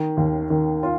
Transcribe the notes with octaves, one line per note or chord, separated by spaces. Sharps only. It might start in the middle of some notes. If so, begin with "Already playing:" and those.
Already playing: D#3
D#2
D#3
F4